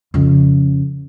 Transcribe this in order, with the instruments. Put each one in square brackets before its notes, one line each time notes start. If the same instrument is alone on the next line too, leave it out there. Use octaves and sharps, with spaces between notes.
[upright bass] F2 C#3